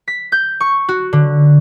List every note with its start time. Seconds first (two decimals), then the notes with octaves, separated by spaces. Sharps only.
0.08 B6
0.32 G6
0.60 C#6
0.88 F#4
1.13 D3